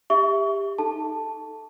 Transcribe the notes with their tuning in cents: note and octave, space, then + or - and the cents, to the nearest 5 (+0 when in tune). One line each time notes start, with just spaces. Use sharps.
G4 +20 E5 -5 C#6 +30
D#4 +0 A4 +0 A5 +0